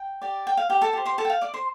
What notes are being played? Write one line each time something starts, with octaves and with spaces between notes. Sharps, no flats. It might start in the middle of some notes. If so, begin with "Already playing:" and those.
Already playing: G5
G4 D5
G5
F5
G4 G5
A4 A5
G4 C5
C5 C6
A4 A5
G5
F5
D5 D6
C5 C6